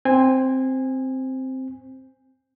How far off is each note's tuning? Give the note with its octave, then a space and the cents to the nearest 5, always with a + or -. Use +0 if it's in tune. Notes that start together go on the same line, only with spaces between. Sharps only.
C4 +0 G#5 -20